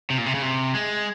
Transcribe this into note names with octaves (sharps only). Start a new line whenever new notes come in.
C3
A#2
C3
C#3
C3
G#3